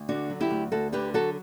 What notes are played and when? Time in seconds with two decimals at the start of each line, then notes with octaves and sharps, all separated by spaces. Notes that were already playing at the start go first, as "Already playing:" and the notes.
Already playing: D2
0.08 D3 D4 F#4
0.30 F#3
0.40 E4 G4
0.51 D2
0.72 D2 F#4 A4
0.93 D3 G4 B4
1.14 F#3 F#4 A4